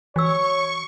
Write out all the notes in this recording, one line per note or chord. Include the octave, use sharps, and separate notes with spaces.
E3 F#4 C#5 C#6 E6